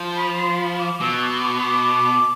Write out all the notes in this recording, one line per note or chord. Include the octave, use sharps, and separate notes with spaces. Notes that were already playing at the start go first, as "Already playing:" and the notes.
Already playing: F3
B5
C6
B5
D6
B2 E6
D6
D6